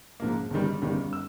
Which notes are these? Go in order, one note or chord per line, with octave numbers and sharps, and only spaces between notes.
G#2 F3 A#3
G1 F#2 D#3 G3
G1 F#2 D#3 G3
E6